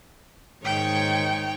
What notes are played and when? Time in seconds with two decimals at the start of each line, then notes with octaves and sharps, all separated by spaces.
0.65 G#2 D#3 C#5 G5